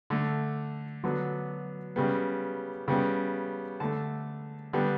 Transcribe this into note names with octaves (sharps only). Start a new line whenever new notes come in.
D3 A3
D3 F#3 B3
C#3 G3 B3
C#3 G3 B3
D3 A3 A5
D3 G3 B3